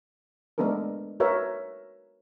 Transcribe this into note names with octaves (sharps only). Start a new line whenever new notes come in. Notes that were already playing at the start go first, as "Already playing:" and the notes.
G#3 A3 B3 D4 A4 A#4
F#4 A#4 B4 C#5 E5